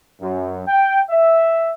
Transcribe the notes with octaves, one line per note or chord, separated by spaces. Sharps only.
F#2
G5
E5